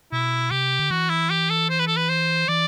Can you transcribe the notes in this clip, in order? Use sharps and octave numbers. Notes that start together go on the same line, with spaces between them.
B2 E4
C3 G4
D3
E3 F#4
E4
G4
A4
C5
B4
A4
B4
C5
E3 D5